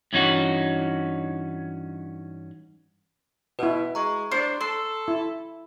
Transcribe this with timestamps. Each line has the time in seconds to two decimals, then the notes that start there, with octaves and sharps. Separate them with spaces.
0.13 G2 E3 C#4 D#4 F#4
3.59 B2 E4 F#4 B4
3.95 G#3 A#5 C#6
4.31 D4 C5
4.61 A4 C6
5.08 E4